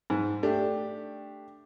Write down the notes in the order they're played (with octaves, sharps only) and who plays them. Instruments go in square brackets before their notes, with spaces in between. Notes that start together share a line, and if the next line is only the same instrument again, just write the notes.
[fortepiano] G#2
A3 D4 G4